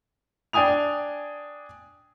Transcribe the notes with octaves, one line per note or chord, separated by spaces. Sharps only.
D4 G5 G#5 D#6 F7